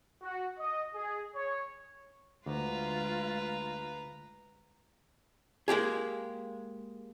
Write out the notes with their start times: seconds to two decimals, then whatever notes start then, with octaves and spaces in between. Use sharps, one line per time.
0.21 F#4
0.58 D#5
0.95 G#4
1.35 C#5
2.46 D2 G#3 F4 B4 A#5
5.68 G#3 A#3 G4 G#4